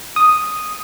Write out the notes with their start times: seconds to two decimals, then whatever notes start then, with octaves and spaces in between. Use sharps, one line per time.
0.16 D#6